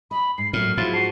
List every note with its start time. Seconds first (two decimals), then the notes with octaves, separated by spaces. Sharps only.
0.11 D#5 B5
0.38 G#2 C7
0.53 A2 F#3 A#3 D4 F6
0.77 G#2 F3 F#3 E4 F4 A6
0.93 F#4 A5 C7